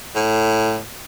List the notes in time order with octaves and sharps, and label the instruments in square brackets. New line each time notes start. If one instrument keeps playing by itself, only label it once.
[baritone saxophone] A2